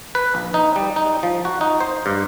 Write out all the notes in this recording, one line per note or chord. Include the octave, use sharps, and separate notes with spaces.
B4
A#1
D#4
G3
D#4
F3
F#4
D#4
C5
G2